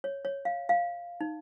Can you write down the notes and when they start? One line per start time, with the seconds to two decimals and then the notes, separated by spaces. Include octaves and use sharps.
0.04 C#5
0.25 C#5
0.45 F5
0.69 F5
1.21 D#4